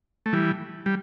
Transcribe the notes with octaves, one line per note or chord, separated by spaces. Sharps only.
A3
E3 G3
G3